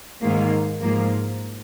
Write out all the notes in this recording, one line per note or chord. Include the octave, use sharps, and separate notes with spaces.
G#2 D#3 A#3
G#2 F3 A#3